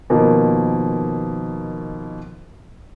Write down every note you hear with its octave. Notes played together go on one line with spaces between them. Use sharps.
B2 D#3 F3 A#3